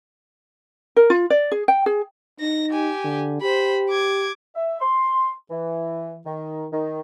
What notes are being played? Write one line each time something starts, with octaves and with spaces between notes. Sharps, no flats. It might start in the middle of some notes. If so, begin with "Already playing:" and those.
A#4
F4
D5
G#4
G5
G#4
D#4 A#6
G4 G#5
D3
G4 C5 B5
D6 G#6
E5
C6
E3
D#3
D#3